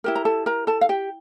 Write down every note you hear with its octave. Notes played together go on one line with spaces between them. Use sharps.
E4 G4 A#4
A#5
A4 A5
A#4 A#5
A4 A5
F5
G4 G5